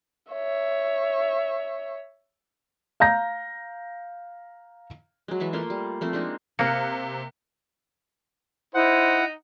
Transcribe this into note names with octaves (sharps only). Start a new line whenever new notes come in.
C#5 E5
F5 A#5 G6 A#6
F#3 G#3
E3 G#3 E5 A5
A3 A#3 F4 C6
G3
F3 A3 C4
G#3 A#3 D4 D#4
C3 A#3 F#6 C#7
D#4 E4 C5 F#5